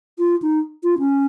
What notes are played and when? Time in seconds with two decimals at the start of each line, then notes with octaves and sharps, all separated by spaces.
0.19 F4
0.42 D#4
0.83 F4
0.99 C#4